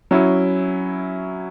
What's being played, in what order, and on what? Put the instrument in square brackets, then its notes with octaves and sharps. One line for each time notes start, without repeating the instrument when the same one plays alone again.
[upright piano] F#3 C#4 E4